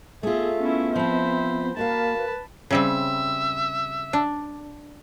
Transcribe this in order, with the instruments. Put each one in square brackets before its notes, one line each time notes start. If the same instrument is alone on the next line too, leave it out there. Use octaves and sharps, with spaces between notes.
[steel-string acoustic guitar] A3 F4 [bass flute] B3 [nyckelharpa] G#4 [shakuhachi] E5
[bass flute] B3 [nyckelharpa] C#4 E4
[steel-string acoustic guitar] F3 C4 [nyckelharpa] C5 B5
[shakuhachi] A#3 [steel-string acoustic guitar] E4 F#4 F5 [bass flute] A#4 [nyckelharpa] A5 B5
[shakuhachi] B4
[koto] C#3 G3 C4 [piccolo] E5
[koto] D4